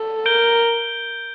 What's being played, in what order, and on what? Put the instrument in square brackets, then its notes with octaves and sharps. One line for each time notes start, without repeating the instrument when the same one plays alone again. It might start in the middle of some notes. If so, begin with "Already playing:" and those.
Already playing: [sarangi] A4
[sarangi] A#4 [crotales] G6 D7 G7